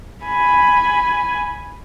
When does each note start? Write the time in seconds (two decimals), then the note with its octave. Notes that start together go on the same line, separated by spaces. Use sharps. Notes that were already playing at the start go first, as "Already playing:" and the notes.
0.24 G#5 B5